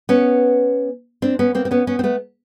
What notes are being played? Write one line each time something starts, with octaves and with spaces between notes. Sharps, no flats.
B3 C#4
C4 D4
B3 C#4
A#3 C4
C4
B3 C#4
B3 C#4
C4
A3 B3